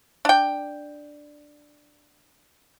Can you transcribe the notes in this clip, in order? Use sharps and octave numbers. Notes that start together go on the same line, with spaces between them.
D4 G5